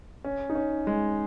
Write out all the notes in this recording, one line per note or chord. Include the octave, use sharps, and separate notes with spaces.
C#4
D#4
C#4
G#3